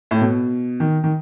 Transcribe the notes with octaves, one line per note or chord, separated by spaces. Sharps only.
A2
B2
D#3
D#3